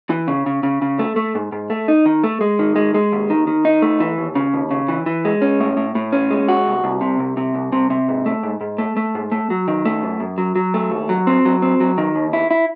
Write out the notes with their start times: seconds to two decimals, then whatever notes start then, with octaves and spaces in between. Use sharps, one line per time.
0.10 E3
0.28 C#3
0.46 C#3
0.63 C#3
0.82 C#3
0.99 A3
1.16 A3
1.35 G#2
1.52 G#2
1.70 A3
1.88 D#4
2.06 D#3
2.24 A3
2.41 G#3
2.59 D#3
2.76 G#3
2.94 G#3
3.12 D#2
3.30 D#3
3.47 D#3
3.65 D#4
3.82 A3
4.00 E3
4.18 D#2
4.35 C#3
4.54 D#2
4.71 C#3
4.88 E3
5.06 E3
5.25 G#3
5.42 C#4
5.60 A2
5.77 A2
5.95 A2
6.13 C#4
6.31 G#3
6.48 F#4
6.66 C2
6.84 C2
7.01 C3
7.19 C2
7.37 C3
7.54 C2
7.72 C3
7.90 C3
8.08 G#2
8.26 A3
8.43 G#2
8.61 G#2
8.78 A3
8.97 A3
9.15 G#2
9.32 A3
9.50 F#3
9.68 D#3
9.85 A3
10.03 F#2
10.20 F#2
10.38 F#3
10.56 F#3
10.74 A3
10.91 D#2
11.09 F#3
11.27 C4
11.45 F#3
11.62 C4
11.80 F#3
11.98 D#3
12.15 D#2
12.33 E4
12.51 E4